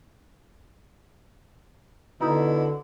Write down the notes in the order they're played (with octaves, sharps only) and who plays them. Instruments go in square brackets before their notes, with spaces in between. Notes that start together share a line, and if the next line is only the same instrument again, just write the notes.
[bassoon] B2 [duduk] D3 [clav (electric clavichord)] D#4 [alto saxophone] E4